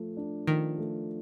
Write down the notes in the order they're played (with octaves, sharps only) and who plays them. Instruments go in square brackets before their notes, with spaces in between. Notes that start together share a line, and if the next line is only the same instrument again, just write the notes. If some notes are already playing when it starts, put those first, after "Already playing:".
Already playing: [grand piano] F3 A3
D4
[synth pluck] D#3 [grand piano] F3
[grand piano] A3